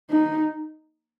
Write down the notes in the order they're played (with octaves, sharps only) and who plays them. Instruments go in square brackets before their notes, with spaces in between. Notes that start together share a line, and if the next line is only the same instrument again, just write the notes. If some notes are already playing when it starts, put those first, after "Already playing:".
[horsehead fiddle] D#4